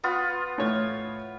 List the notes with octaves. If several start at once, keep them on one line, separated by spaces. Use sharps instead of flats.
B3 F4
A2 C#5